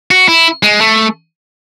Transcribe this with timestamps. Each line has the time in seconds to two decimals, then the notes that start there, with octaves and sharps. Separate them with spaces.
0.11 F#4
0.28 E4
0.63 G#3
0.81 A3